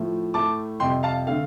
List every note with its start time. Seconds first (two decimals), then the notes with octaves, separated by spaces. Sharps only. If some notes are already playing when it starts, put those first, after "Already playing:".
Already playing: A2 F3 A3
0.34 A2 A3 A5 D6
0.80 F2 C3 G3 G5 C6
1.03 F5 A5
1.27 D3 A3 F5